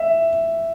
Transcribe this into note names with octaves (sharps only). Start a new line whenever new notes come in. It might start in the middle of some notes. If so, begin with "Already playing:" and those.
Already playing: E5